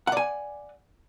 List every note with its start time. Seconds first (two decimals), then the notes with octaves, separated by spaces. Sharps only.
0.07 F#5
0.12 D5
0.17 G#5